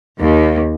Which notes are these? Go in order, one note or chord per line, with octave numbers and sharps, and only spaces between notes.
D#2